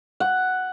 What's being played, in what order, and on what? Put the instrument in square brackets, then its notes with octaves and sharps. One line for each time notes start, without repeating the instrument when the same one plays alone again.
[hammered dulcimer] F#5